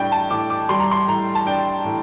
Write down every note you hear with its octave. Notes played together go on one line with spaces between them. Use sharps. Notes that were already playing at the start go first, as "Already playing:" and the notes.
Already playing: A2 G3 D4 G5
A5
A2 D6
D6
G3 C6
A#5
C6
A2 A#5
A5
D4 G5
A2